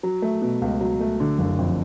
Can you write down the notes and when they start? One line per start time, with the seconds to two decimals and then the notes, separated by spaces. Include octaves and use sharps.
0.03 F#3
0.22 A3
0.42 B2
0.62 C#2
0.81 F#3
1.00 A3
1.20 D3
1.39 F#1
1.59 F2